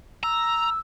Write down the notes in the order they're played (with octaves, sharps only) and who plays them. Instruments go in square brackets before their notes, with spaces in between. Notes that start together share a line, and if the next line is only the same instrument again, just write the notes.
[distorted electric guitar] A#5 [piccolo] E6